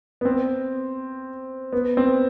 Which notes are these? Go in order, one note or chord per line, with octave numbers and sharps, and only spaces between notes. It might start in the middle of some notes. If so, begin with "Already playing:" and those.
B3
C4
B3
C4